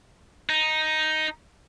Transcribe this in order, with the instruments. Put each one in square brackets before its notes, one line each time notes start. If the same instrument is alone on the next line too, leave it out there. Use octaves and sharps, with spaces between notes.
[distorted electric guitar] D#4